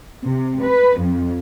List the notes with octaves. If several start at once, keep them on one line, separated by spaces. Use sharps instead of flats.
C3
B4
F2